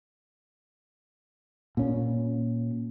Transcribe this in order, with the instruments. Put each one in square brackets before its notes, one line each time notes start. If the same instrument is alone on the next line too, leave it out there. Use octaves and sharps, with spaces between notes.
[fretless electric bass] A#2 C#4